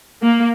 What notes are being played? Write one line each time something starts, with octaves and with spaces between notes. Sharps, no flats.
A#3